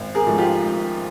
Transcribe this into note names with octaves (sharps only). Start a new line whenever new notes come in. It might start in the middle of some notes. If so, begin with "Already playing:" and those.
Already playing: G#1
G#4 A#4
G#2 F3 A3
F4 G4
G#1